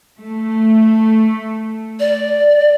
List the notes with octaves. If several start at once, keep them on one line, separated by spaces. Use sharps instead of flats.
A3
D5